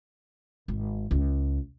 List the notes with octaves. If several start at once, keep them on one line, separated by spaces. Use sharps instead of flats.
G#1
C#2